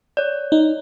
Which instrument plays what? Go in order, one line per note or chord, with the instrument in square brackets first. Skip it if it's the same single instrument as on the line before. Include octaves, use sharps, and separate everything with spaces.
[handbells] C#5 D5
[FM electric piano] D#4